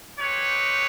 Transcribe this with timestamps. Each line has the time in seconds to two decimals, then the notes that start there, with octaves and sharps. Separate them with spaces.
0.19 G#3 C4 D#4 G4 B4 C#5